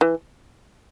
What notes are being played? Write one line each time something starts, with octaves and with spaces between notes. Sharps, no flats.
E3